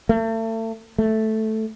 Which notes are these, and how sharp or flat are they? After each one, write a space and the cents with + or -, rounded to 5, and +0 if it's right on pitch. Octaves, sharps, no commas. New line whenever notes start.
A3 +35
A3 -5